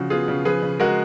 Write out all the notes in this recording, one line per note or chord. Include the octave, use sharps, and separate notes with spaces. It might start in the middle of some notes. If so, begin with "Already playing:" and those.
Already playing: C#3 F3 F#4
B3 F4 G#4
C#3
F3 G#4 B4
C#3
G#3 F#4 A#4